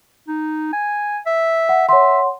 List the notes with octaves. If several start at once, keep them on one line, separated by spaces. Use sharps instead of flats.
D#4
G#5
E5
F#5
C#5 E5 F#5 C6